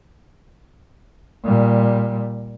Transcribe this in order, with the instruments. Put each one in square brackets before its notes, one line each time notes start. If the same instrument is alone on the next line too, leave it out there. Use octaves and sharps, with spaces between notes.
[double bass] A#2 G3